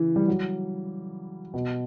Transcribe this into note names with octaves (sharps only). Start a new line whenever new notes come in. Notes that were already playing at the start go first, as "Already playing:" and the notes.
Already playing: C#3 E3
G3
F#3
B2